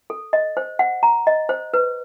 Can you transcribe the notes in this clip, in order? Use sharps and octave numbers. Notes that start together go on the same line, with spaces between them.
A4
D#5
C5
F#5
A#5
D#5
C5
B4